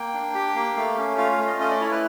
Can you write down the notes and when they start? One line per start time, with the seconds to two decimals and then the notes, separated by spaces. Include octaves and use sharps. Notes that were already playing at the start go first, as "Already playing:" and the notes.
Already playing: A#3 G5
0.14 D4
0.34 G4
0.56 A#3
0.76 A3 F5
0.98 C#4
1.18 F4 F5
1.32 F5
1.39 A3
1.47 D#5
1.60 C#4 D#5
1.70 D5
1.80 E4 C#5
1.91 B4